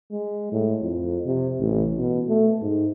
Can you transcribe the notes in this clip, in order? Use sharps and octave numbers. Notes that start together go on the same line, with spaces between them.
G#3
A2
F2
C3
A1
B2
A3
G#2